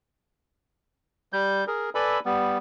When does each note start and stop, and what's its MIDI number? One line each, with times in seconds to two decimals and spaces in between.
1.33 1.64 55
1.33 1.64 91
1.67 1.90 68
1.67 1.90 70
1.95 2.20 69
1.95 2.20 71
1.95 2.20 74
1.95 2.20 80
1.95 2.20 83
1.95 2.20 88
2.25 2.58 55
2.25 2.58 59